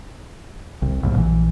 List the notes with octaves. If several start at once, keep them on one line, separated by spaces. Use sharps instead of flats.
C2
C2 F#2 A#2
A#1 E3